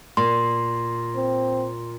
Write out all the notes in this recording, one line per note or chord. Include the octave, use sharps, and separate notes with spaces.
A#2 C6
C4